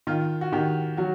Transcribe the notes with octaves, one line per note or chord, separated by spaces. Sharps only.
D#3 F4
F#4
D#3 G4
F#3 F#4